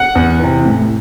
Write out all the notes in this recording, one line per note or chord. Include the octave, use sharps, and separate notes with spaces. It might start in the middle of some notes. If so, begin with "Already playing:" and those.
Already playing: F#5
E2
C3 E3
A2